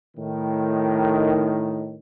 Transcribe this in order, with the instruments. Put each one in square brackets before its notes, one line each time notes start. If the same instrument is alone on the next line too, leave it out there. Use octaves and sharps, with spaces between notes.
[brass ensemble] A2 D#3